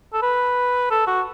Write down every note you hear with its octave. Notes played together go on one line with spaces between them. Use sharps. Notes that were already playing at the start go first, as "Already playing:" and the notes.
A4
B4
A4
F#4